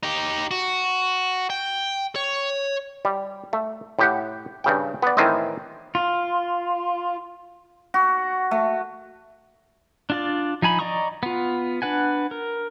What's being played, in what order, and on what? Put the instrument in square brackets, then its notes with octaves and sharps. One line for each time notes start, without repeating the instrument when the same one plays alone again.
[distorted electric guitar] D#4 G4
F#4
G5
C#5
[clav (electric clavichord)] G3
A3
A2 G4 F#5
G2 C#3 G5
B3 D5
A2 D#3 E3 C4 C5 D#5
[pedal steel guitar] F4
[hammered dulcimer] F#4
A3
[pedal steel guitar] D4 F4 D5
F3 D#4 G#5 B5
D5 D#5 A#5 C#6 D#6
B3 F4
D4 B4 F#5 G#5
A#4